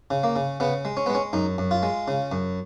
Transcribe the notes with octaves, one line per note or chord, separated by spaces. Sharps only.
C#3
A#3
C#3
C#3 B3
G#3
C#4
G#3 B3
C#4
F#2 D#4
F#2
F4
G#3
C#3
F#2